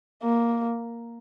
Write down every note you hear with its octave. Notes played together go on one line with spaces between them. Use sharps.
A#3